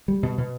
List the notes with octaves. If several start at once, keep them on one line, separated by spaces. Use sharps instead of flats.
G3
B2
B2